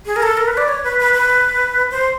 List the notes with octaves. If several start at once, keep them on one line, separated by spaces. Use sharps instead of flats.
G#4
A#4
A4
A#4
B4
D5
C#5
B4
B4
B4
C5